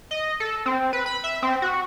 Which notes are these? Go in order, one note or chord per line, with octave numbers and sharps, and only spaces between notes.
D#5
A4
C4
B4
B5
E5
C4
F#4